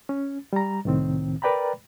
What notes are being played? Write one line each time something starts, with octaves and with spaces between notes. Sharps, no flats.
C#4
G3 A#5
C2 A2 D#3 C4
A#4 B4 D5 G5 A#5 B5